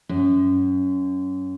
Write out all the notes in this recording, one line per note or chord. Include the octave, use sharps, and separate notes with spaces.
F#2